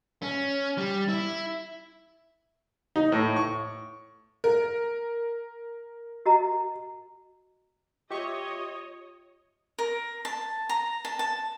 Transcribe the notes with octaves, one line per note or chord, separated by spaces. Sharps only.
C#4
G3
E4
D#4
A2
C#6
A#4
F#4 D#5 A#5
F4 G4 C#5 D#5 E5 C#6
A#4
A5
A#5
A5
A5